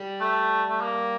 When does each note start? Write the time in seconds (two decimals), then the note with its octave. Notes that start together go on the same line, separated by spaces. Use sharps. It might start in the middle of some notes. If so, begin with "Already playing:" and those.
Already playing: G3
0.21 A3
0.70 A3
0.81 A#3